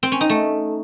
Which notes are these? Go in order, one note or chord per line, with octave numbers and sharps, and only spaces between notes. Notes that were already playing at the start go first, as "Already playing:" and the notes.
C4
C#4
D#4
A3